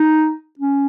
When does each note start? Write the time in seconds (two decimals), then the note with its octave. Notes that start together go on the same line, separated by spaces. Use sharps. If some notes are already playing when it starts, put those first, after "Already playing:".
Already playing: D#4
0.59 C#4